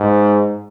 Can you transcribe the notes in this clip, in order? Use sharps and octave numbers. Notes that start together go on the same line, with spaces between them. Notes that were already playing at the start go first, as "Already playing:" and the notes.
Already playing: G#2